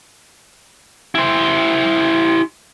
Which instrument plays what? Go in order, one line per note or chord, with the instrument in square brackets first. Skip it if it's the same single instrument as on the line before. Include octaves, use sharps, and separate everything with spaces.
[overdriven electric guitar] E4 C5